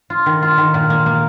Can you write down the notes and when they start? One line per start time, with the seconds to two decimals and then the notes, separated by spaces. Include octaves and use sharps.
0.10 F4
0.26 D#3
0.42 F4
0.58 D#3
0.74 A#2
0.90 A#3
1.06 A#3